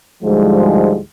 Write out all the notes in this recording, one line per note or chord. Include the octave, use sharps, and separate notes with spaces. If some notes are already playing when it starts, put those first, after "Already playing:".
D2 G#2 F3 G3 G#3